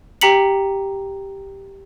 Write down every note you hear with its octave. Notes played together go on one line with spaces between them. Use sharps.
G4 G5 A#5 B6 C#7 F#7